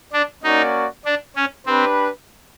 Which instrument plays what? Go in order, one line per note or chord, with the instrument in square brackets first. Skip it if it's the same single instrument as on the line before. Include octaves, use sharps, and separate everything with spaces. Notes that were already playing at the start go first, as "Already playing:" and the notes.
[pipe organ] D4
[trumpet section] A#3 C#4 F#4 A#4 D5 [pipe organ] D#4
[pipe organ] D4
C#4
[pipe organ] C4 [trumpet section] D4 G4 B4